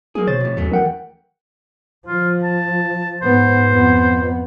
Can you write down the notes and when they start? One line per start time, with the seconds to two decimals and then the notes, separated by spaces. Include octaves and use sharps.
0.15 F#3 A#3 G#4
0.27 B2 C5 C#5 A6
0.40 F2 A2
0.57 D#2 F#3 A3 C#4
0.72 E3 A#4 F#5 G5
2.07 F3 F4
2.43 A5
3.22 G#2 B3 C5
3.71 F2 B3